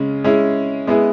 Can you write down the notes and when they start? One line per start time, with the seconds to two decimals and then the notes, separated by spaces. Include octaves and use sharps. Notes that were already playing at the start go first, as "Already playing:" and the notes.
Already playing: C#3 G#3 C#4 G#4
0.24 G#3 C#4 E4 G#4
0.87 G#3 B3 E4 G#4